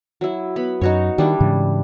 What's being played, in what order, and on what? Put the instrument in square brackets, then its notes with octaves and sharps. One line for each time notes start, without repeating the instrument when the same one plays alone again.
[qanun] F#3 E4
B3 B5
[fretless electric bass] F#2 [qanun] D#4 F#4 C#5
[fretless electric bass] D#3 [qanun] G3 D4 E4
[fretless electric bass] G#2 C#3 E3